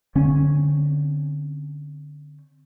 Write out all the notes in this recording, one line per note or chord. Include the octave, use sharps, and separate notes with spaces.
D3 C4 C#4